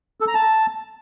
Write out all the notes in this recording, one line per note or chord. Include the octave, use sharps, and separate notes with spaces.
A4
A#5
A5